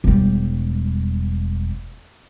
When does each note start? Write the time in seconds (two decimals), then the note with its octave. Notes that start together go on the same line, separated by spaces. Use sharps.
0.04 E1 G3